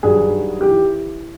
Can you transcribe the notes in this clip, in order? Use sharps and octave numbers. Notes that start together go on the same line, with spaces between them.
G2 D#3 F#3 G#4
E3 G4